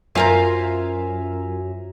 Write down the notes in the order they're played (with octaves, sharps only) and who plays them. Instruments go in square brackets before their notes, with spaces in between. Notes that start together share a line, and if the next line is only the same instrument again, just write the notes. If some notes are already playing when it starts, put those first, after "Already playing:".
[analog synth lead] F#2 [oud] F4 A#4 C5 [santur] E5 G#5 A#5